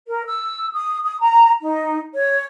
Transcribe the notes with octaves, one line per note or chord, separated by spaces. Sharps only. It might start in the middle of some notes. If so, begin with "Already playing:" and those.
A#4
E6
D#6
D#6
A#5
D#4
C#5